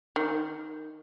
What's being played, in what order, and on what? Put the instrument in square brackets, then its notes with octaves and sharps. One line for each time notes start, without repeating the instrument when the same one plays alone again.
[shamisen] D#3